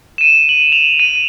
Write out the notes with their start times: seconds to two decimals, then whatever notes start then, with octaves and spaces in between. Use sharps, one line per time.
0.18 D#7 E7
0.49 F#7
0.72 F7
0.99 D#7